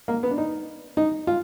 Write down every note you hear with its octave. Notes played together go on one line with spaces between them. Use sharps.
A#3
B3
D4
D#4
D#4
F4